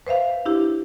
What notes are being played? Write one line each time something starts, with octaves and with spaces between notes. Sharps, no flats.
B4 C5 E5 F5
D4 E4 G4